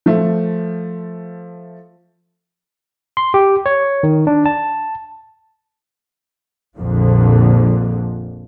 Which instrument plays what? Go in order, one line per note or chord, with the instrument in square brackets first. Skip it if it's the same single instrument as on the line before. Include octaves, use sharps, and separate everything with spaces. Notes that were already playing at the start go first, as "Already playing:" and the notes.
[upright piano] F3 A3
[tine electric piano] C6
G4
C#5
D#3
D4
A5
[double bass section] A#1 F2 A#2 D3 F3